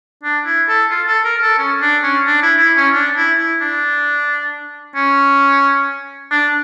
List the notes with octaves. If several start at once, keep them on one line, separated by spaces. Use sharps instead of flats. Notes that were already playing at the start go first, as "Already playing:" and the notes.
D4
E4
A4
F4
A4
A#4
A4
C#4
D4
C#4
D4
E4
E4
C#4
D4
E4
E4
D4
C#4
D4